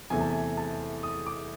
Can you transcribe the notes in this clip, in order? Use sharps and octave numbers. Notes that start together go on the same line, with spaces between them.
E2 C3 E3 A3 G#5
A5
G#5
A5
D#6
D6